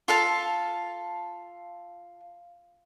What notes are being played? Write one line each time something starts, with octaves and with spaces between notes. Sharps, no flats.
F4 A4 F5 A5